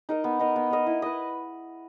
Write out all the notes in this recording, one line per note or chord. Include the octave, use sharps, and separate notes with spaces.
D#4 A#4 D#5
B3
D#4 A#4 D#5
B3
D#4 A#4 D#5
E4
B4 D#5